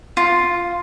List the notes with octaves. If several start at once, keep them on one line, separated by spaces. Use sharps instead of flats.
F4